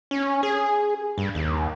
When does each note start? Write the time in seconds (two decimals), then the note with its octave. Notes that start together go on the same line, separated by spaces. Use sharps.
0.11 C#4
0.43 G#4
1.18 G2
1.35 D#2